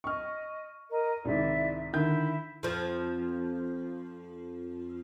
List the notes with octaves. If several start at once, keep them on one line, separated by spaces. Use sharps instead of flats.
D#5 C#6 F6
A#4 D#5
C2 G#2 D#3 E4 D5 E5
D3 D#3 E4 G6
F2 F3